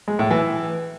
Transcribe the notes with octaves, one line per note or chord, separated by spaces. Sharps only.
G#3
A2
E3